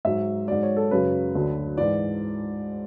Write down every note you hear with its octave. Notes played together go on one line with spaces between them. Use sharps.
G#2 F#3 E5
G#2 F#3 D5
C#5
A4
F#2 C#3 F#3 B4
D2 D3 F#3
G#2 E3 D5